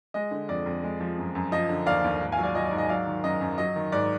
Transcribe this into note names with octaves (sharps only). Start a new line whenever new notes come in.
G#3 D#5
D3
F2 D5
F2
G#3
F3
F#2
F#2
F3 D#5
D3
D#2 D5 F5
D#2
G#2
F5 G#5
F#3
D5 F5
F#3 D#5
D5
G#2
D#5
F#3 D5 F5
D#3
F#2 D#5
F#2
F#3 D#5
D#3
G#2 D5